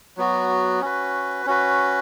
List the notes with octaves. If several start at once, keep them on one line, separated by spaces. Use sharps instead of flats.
F#3 B3 F#4
C#4 F#4 B4
C#4 F#4 B4